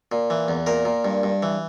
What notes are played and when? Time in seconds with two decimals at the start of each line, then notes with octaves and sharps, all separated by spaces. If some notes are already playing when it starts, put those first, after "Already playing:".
0.12 A#2
0.30 E3
0.48 E2
0.67 A#2 A#4
0.85 A#2
1.05 G2
1.23 G2
1.43 E3